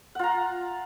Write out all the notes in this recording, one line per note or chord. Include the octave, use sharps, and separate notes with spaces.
F4 F#5 A#5